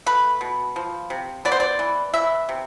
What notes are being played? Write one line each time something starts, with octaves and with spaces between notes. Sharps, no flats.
A3 B4
B2
F3
C3
B3 D5
C5
D5
E3
E3 E5
C3